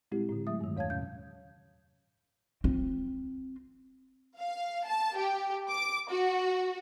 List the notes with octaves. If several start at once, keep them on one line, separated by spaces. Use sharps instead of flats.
A#2 G3 G#3 C4 E4 G4
A2 D3
F#3 A3 E5 D#6
G2 D#3
E2 C#5 F5 A5 G#6
A2 C3 C#4 F5 G6
C4 F4
F5
A5
G4
D6
F#4